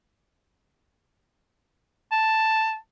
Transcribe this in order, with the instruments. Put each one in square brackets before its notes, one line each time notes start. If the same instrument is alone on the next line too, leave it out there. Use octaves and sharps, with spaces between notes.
[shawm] A5